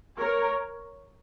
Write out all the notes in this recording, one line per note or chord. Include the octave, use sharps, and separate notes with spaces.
A#4 C#5